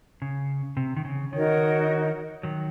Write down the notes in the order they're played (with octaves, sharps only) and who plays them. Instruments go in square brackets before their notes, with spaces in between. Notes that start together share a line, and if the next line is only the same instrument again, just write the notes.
[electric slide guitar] C#3
C3
D#3
C#3
[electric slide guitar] D#3 [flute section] D#4 F#4 A#4 C#5
[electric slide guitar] D#3 F#3